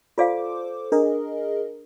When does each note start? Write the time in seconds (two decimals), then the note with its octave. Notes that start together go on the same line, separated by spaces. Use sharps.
0.18 F4 A4 C5 D5 F5 D6
0.92 D4 G#4 A#4 D#5